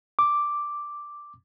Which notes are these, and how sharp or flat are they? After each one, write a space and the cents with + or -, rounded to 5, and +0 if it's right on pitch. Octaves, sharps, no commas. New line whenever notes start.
D6 +0